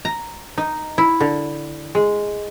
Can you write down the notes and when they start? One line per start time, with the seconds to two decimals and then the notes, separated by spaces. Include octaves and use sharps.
0.05 A#5
0.58 D#4
0.98 E4
1.20 D3
1.95 G#3